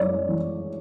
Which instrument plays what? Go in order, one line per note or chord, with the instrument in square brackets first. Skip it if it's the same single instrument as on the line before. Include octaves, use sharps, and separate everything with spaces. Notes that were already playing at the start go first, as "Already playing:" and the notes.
Already playing: [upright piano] F#2 G#3 C#5 D5
E3